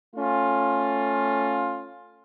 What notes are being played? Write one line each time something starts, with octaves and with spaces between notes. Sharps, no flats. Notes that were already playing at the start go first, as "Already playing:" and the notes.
A3 C#4 F4